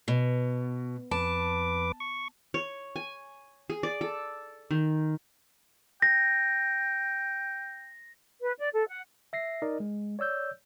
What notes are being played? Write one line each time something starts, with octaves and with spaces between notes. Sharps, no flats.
B2
F2 B4 A5 D6
C#6
C#5
G#5
G#4
D5
A4
D#3
G5 A#6
B4
D5
A4
F#5
E5 A#6 C7
D#4 A#4 D5 D#5
G#3
C#5 D5 E6 G6